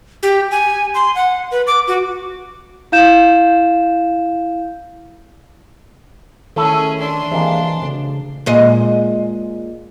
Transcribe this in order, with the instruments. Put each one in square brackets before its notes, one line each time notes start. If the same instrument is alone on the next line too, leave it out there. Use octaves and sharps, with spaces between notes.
[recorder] G4
G#5
C6
F#5
B4
D6
F#4
[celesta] E4 F5 G6 E7
[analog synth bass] D#3 [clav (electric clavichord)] A3 E4 A4 [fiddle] C#4 G#4
[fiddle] D4 C6
[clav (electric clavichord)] C3 G#3 A#3 [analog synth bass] E3
[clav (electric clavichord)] D2 [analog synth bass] C#3
[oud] A#2 G#3 D#5